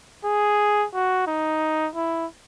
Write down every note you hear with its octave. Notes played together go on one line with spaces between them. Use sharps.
G#4
F#4
D#4
E4